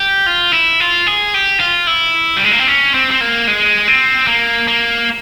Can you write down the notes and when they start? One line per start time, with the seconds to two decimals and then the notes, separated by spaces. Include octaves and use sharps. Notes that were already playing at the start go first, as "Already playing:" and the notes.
Already playing: G4
0.26 F4
0.53 E4
0.80 F4
1.07 G#4
1.34 G4
1.60 F4
1.87 E4
2.37 G3
2.44 G#3
2.52 A#3
2.60 C4
2.67 C#4
2.94 C4
3.11 C4
3.21 A#3
3.47 G#3
3.88 C4
4.27 A#3
4.68 A#3